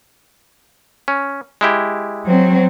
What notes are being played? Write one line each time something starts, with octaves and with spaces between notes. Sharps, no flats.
C#4
G#3 E4 G4
F#3 C4